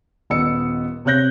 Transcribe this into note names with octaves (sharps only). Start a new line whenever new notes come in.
D#1 B3 D#5 E6 C#7
C3 C4 C#5 F#6 G6 A#6